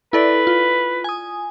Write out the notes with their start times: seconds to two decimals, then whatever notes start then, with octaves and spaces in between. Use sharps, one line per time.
0.13 E4 A4 B4 D5
0.47 F4
1.04 G#5 D#6